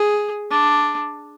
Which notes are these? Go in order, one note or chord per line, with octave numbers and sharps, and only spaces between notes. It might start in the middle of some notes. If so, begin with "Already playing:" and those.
Already playing: G#4
D4